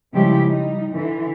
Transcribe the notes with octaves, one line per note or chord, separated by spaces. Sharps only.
C#3 F3 G3 G#3 E4 G4
G3 D#4
D3 E3